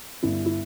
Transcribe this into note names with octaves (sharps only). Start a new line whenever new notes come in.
G1 E4
E4